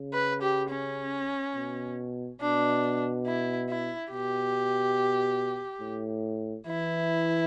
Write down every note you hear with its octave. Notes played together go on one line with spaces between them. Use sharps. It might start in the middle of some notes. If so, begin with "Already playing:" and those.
Already playing: C#3
B4
G4
C#4
B2
B2 D4
E4
E4
B2 G4
A2
E3 E4